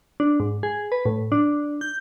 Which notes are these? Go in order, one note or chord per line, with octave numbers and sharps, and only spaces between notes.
D4
G#2
G#4
B4
A2
D4
G6